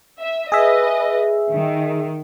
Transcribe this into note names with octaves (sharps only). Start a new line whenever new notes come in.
E5
G#4 B4 D#5 E5
D#3